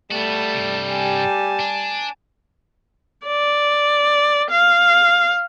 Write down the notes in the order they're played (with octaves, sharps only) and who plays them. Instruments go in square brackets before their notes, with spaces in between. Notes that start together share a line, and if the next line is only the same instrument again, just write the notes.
[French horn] G3 [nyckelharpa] A3 A5 [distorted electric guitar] B3 F#4
[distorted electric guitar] G2 C3
[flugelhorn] G4 [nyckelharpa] G#5 A5
[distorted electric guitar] D4
[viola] D5
F5